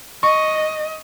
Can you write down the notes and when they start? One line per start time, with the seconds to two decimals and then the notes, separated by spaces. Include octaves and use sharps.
0.23 D#5 C#6